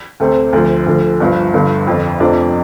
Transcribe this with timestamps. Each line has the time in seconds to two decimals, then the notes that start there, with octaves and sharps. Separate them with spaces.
0.20 D2 C3 A3 C4
0.53 D2 D3 F3
0.86 D2 D3 F3
1.20 G1 G2 F3
1.54 G1 G2 D3
1.87 G1 F2 D3
2.20 F2 C3 F3 A3 D4